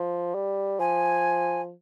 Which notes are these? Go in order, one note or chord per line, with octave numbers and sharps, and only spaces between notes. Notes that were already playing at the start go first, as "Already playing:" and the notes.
Already playing: F3
G3
F3 G#5